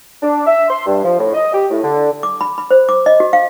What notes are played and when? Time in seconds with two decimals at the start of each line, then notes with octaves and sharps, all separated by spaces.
0.23 D4
0.47 E5
0.69 C6
0.87 G2
1.05 F3
1.19 A2
1.33 D#5
1.53 G4
1.71 A2
1.84 D3
2.23 D6
2.41 B5
2.58 B5
2.71 C5
2.89 D6
3.06 D#5
3.20 F#4
3.33 F5